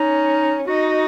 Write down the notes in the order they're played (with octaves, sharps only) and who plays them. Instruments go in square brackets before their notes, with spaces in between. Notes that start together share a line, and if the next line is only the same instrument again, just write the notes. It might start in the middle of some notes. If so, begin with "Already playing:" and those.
Already playing: [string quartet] C#4 [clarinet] D#4
[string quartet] D#4 [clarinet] F#4